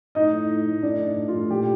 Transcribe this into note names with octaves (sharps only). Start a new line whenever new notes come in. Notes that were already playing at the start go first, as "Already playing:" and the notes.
A2 D#4 D#5
A2
A2
A2
A2 D4 D5
A2
A2
F4
A2
A#2 G4